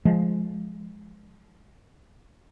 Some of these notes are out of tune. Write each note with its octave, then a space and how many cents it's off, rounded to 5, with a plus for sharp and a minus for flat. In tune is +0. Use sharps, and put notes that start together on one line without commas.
F3 +0 G#3 +5